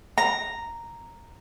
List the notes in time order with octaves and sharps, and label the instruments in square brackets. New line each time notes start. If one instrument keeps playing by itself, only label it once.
[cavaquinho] A#5